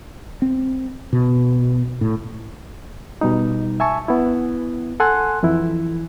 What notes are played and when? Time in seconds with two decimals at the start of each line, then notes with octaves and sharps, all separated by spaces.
0.42 C4
1.13 B2
2.01 A2
3.21 B2 G3 D#4
3.80 E5 G#5 A5 C#6
4.08 B3 E4
5.00 A4 F#5 G#5 C6 F#6
5.43 F2 E3 E4